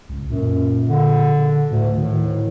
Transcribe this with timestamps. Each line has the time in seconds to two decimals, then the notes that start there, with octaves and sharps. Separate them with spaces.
0.09 C#2
0.30 F#2 A#2
0.89 D3
1.71 D2 A2
1.97 A2 D#3